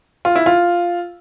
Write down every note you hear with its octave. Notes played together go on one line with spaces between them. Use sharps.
F4
E4
F4